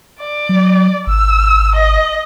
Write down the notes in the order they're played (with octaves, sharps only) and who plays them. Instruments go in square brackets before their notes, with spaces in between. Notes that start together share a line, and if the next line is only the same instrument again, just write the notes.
[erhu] D5
[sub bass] F#3
[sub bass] G#1 [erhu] E6
[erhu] D#5